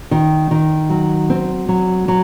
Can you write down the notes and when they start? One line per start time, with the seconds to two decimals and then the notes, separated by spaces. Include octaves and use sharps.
0.11 D#3
0.51 D#3
0.90 F#3
1.30 C4
1.68 F#3
2.08 F#3